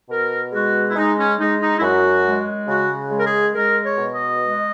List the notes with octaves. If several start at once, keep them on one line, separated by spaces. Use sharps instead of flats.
B2 A#4
G#3 F#4
E4
G#3 D#4
C#4
G#3 D#4
D#4
E4
F#2 F#4
G#3
C#3 F#4
G#3
A#4
G#4
G#3 A#4
C#5
B2
D#5
G#3